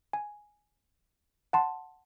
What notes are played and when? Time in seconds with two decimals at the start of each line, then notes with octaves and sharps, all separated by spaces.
0.13 G#5
1.53 F#5 A5 C6